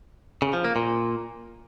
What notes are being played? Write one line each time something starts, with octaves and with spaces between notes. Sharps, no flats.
C#3
F3
A#3
A#2